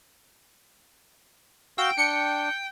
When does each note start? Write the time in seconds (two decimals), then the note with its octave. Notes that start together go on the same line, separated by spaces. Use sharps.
1.78 F#4 F5 G5 E6
1.98 D4 C#7